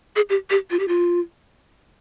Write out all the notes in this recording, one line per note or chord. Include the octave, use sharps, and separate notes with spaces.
G#4
G4
G4
F4
G4
F4